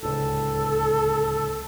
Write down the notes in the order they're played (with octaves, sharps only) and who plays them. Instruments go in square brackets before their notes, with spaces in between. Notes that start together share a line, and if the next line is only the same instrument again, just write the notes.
[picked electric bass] D1 C#2 [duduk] A4